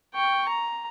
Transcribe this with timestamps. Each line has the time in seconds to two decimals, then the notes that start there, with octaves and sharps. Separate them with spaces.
0.14 G5 C#6
0.48 A#5